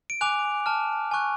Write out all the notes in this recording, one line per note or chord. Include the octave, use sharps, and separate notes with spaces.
D7
G#5 D6 F#6 F7
A5 F6
G#5 C#6 F#6